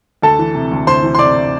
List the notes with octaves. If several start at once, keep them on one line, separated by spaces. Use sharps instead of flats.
D2 A4 A5
E3
C3
D2
D2 C5 C6
E3
C6
C3 D5 D6